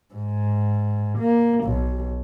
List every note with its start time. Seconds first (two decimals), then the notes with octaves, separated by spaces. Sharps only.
0.14 G#2
1.18 A#3
1.65 B1